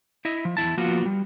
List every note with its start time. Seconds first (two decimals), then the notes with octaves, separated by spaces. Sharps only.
0.25 E4 D#5 E5
0.45 F3
0.57 E2 G#2 E4 A5
0.77 F3 A#3 B3 F4 F#4
1.06 G3